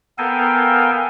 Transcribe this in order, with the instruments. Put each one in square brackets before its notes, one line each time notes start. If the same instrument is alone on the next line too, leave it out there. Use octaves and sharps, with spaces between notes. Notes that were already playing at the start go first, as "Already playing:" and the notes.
[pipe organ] B3 A4 A#4 F5 G5 G#5